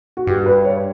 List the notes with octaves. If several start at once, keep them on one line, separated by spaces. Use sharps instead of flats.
F#4
G2 G4
B4
C#5